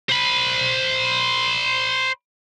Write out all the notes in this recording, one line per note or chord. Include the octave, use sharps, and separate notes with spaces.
C5 B5